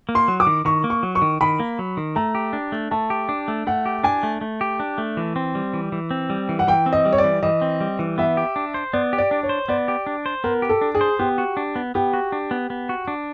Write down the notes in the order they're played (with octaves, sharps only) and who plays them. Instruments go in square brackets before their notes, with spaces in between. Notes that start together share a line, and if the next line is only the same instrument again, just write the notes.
[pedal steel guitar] A#3
[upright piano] C6
[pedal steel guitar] F#3
[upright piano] D6
[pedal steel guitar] D#3
[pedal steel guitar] D#3 [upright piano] C#6
[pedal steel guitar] A#3
[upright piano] C#6
[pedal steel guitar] F#3
[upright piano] C#6
[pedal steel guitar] D#3
[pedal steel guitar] D#3 [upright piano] B5
[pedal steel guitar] A#3
F#3
D#3
[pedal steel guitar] A3 [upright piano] A#5
[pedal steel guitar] G4
D4
A3
[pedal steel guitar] A3 [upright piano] A5
[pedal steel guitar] G4
D4
A3
[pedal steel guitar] A3 [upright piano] F#5
[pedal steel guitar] G4
[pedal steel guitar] D4 [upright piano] G#5
[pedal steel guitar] A3
A3
G4
D4
A3
E3
C4
G3
E3
E3
C4
G3
E3
[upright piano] F#5
[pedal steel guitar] E3 [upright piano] G5
[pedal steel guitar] C4
[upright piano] D#5
[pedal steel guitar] G3
[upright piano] C#5
D5
[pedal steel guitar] E3
[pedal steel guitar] E3 [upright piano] D#5
[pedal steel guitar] C4
G3
E3
[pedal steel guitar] B3 [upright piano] E5
[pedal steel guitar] G4
D4
C5
[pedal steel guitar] B3 [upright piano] D5
[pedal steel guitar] G4
[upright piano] D5
[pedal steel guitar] D4
[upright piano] C#5
[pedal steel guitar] C5
[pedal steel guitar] B3 [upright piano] D5
[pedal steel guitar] G4
D4
C5
[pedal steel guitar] B3 [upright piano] A#4
[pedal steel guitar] G4
[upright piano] A4
[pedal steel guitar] D4
[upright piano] G#4
[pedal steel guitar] C5
[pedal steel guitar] B3 [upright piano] G4
[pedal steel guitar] F#4
D4
B3
[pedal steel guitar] B3 [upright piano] G4
[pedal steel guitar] F#4
D4
B3
B3
F#4
D4